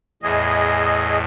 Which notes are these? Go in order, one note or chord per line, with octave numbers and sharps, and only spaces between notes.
E2 A2 G#4 D#5